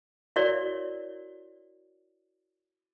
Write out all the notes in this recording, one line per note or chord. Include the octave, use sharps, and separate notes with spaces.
E4 F#4 A#4 C#5 D5